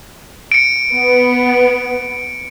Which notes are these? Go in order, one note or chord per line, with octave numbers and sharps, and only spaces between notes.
C#7 D7
B3